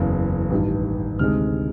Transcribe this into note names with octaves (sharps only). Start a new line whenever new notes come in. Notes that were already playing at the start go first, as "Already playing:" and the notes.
Already playing: F#1 E2 C#3
A1 G2 D#3
D2 C3 D#3 G#3 F6